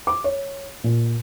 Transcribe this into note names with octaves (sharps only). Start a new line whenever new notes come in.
D6
C#5
A#2